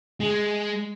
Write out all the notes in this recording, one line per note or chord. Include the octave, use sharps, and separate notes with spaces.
G#3